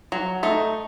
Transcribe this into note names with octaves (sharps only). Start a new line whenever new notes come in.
F#3
A3 D#4